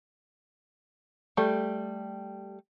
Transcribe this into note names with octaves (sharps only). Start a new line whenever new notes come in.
G3 A3 G4